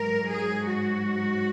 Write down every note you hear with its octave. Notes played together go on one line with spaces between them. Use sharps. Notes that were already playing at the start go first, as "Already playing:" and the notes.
Already playing: G#2 F#3 A#4
G#4
F#4